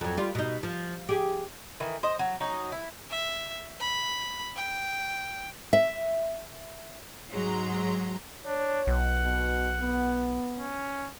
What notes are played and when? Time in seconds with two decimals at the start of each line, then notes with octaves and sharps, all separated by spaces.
0.01 F2 F#3
0.17 G3 F4
0.35 B2 D#4
0.63 F3
1.09 G4 G#4
1.80 D#3 E3
2.03 C5 D#5
2.19 F#3
2.40 F#3 C#4 D#4
2.72 E4
3.10 E5
3.80 B5
4.56 G5
5.73 E5
7.32 G#2 F#3 G#3 A#5 C6
8.46 D4 C#5
8.87 B1 F#5
9.23 B2
9.81 B3
10.58 C#4